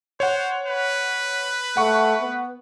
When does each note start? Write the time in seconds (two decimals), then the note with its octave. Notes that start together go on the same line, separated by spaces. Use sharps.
0.20 C5 C#5 F#5
0.66 B4
1.77 A3 F#5 C#6
2.21 B3